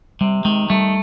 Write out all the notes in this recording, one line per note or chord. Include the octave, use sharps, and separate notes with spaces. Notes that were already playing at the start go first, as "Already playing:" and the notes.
C3 G3
D#3 G#3
G3 A3